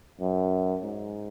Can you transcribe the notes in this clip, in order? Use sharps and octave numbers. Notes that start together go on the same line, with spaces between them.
F#2
G#2